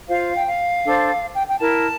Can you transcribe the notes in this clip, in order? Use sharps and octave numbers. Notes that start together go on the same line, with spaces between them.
F4 C5 F5
G5
F5
D4 A4 C5
G5
G5
E4 A#4 A5